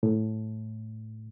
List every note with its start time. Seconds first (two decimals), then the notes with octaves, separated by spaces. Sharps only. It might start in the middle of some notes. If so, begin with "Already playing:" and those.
0.03 A2